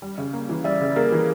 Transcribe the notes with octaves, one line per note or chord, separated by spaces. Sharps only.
G3
C#3
A#3
E3
G3 D5 E5
C#3
A#3 G#4 A#4
E3